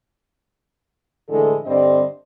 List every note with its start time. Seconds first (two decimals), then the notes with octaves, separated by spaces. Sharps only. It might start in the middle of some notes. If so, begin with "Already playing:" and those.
1.29 A2 D3 E3 G#3 A4
1.65 G2 D3 G3 C4 D5 D#5